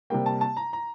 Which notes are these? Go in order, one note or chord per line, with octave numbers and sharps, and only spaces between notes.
C3 G3 A#3 G5
A5
A5
A#5
A#5